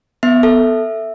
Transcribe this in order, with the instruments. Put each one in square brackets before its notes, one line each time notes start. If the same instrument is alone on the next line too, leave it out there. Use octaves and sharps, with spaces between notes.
[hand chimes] B3 E5
A4